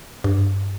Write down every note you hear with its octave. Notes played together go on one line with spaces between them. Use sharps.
G2